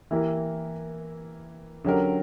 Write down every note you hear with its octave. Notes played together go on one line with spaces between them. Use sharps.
E3 A#3 E4 G4 A#4
D3 F#3 C#4 G4 A#4